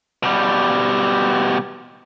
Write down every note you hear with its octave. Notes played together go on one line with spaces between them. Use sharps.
B2 G3